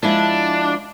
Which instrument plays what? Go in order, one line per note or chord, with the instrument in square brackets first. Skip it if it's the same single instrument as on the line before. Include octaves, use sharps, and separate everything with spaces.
[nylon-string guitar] F3 G#3 E4 [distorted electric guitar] D4